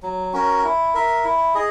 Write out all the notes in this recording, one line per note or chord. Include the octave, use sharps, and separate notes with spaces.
F#3
C#4 F#4 A#4
E4
A#4 E5
E4
G#4 D#5